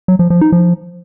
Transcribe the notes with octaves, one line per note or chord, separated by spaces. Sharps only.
F#3
F3
F3
D#4
F3